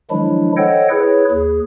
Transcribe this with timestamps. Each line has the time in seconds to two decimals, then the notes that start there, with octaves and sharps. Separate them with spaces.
0.11 D#3 F3 F#3 G#3 D4 E4
0.57 A4 C5 C#5 D#5 F#5 G5
0.90 E4 G#4 B4 C#5
1.31 D#2 G#4